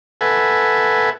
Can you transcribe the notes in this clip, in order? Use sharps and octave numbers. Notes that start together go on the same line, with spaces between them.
A4 B4 E5 F#5 G#5